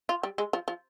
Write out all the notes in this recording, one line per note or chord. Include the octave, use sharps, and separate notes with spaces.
F4
G3
G#3
F3
F3